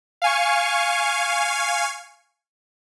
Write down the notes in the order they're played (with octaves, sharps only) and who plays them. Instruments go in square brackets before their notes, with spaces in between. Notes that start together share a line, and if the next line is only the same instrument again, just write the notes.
[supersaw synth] F5 G#5 C#6